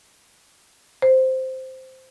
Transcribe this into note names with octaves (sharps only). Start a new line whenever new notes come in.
C5